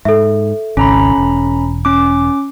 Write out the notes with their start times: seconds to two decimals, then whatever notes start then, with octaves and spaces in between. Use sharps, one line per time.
0.05 G#2 A4 E5
0.77 G#1 C#2 C#4 A#5 B5
1.18 E1
1.85 C#4 D6